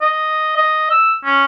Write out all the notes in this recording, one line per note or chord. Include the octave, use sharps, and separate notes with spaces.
D#5
D#5
E6
C#4